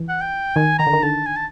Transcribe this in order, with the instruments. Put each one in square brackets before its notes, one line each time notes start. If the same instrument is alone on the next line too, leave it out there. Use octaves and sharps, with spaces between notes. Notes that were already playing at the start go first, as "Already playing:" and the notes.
Already playing: [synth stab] E3
[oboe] F#5
G5
[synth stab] D#3 [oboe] G#5
[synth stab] D#3 [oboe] A#5
[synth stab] D3
D#3
[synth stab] D3 [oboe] A5
[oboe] G#5
A5